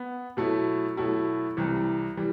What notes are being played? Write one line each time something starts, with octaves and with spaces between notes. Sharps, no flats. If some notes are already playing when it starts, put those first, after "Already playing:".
Already playing: B3
B2 F#3 A3 E4
B2 F#3 A3 E4
C2 C3 E3 G3
E3 G3